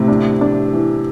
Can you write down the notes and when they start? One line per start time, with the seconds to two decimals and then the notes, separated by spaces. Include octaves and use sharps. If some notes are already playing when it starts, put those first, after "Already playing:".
Already playing: A2 C3 C4
0.08 D4
0.41 D4
0.73 E3